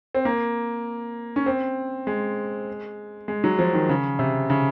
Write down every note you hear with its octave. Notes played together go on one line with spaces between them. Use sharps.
C4
A#3
C#4
C4
G#3
G#3
F#3
F3
D#3
C#3
C3
C#3